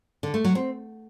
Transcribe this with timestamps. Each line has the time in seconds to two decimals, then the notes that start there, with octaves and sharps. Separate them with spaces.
0.23 D3
0.34 A3
0.45 F#3
0.55 C4